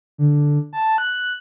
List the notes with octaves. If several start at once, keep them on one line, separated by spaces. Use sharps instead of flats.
D3
A5
F#6